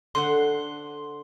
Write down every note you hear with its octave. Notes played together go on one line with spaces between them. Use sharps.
D3 C5 F#5 C6